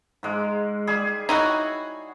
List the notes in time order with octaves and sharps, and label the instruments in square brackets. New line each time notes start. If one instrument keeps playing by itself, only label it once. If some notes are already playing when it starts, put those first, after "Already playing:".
[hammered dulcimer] G#2 G#3
G3 G#4
[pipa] D#4 E4 F#4 [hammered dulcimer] C#5